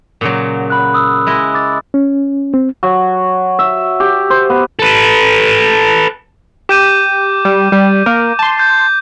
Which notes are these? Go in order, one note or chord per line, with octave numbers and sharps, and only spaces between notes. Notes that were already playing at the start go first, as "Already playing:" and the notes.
A#2 C#3 F#3
B5 F#6
D#6 E6
G#3 E4 D#5
D6 A6
C#4
C4
F#3
E5
G4
C5
B3
A4 B4
G4 D6 G6 D#7
G3
G3
A#3 A#4
A5 C6
G6